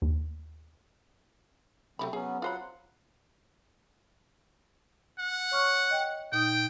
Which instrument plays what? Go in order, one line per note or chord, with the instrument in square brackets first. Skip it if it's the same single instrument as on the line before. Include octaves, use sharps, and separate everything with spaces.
[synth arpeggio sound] D#2
[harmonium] C3 F#3 C4 [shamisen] A3 E4 B5
[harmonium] F#3 B3 C#4 [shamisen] G#4
[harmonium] F#3 F#5 [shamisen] F4 C5 B5
[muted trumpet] F#5
[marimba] C#5 C#6 F6
D#5 G5
[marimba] A#2 D#4 D#6 [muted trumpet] G5